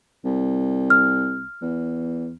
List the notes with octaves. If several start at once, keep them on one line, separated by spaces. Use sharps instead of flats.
C2
F6
E2